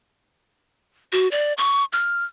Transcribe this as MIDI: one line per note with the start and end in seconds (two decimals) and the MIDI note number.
1.12 1.30 66
1.31 1.53 74
1.58 1.85 85
1.93 2.24 89